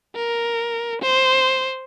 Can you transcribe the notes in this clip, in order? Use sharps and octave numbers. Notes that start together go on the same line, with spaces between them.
A#4
C5